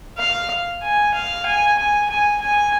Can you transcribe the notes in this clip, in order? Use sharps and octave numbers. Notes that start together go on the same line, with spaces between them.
F5
G#5
F5
G#5
G#5
G#5
G#5